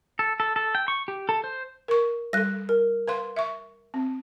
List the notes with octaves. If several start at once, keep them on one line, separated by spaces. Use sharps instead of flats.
A4
A4
A4
G5
C#6
G4
A4
C5
A#4 C#6
G3 A4 F#6 A#6
A#4
B4 F5 C6
E5 C#6
C4